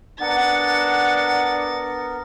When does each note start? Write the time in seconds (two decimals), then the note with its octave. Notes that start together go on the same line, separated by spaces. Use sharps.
0.21 B3 D4 A#4 F#5 A6